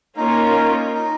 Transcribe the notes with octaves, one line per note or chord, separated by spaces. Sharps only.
A#3 C#4 D#4 F4 A#4
D#4